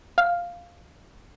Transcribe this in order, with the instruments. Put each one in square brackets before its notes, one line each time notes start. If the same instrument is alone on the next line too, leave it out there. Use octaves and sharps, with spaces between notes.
[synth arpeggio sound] F5